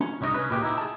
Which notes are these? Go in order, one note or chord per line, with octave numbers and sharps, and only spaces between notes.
C#4
C2 C#4 D#4 C#5 D#5
C#4 B4
C#2 A#2 G#3 G4
D#4 E4
G#4 A5